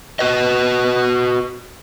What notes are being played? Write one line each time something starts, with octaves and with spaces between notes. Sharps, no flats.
F#4 B4 D#5